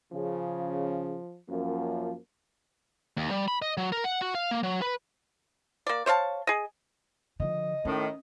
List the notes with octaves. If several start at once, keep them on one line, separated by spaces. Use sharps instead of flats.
C#3 F3
F#2 F3 A#3
D#2
G3
B5
D#5
F#3
A#4
F#5
F#4
F5
A#3
F#3
B4
A#3 D5
C5 C#5 F5 A5
G#4 D#5
D3 F3 D#5
A2 D#3 C#4